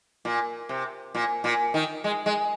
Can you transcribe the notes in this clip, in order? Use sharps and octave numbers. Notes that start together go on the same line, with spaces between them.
A#2
C3
A#2
A#2
D#3
G#3
G#3